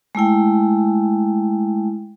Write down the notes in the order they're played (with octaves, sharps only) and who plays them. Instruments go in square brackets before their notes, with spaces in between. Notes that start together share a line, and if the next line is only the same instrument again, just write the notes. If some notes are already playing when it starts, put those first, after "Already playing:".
[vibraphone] G#3 A3 E4 G5